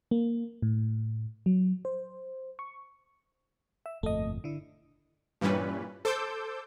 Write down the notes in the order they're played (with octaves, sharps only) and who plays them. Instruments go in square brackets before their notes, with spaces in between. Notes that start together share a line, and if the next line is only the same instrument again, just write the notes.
[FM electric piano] A#3
A2
F#3
C5
C#6
E5
[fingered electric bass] G1 F2 A#2 [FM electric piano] A3 D#5
[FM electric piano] D3 E4
[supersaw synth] G2 A#2 E3 G3 C#4 B4
A4 C5 D6 E6 G6